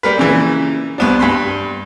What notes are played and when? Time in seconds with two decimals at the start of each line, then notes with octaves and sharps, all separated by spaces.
0.03 G3 A#4 B4
0.18 A#2 C#3 E3
0.98 C2 B3 D4
1.19 G2 B5 C6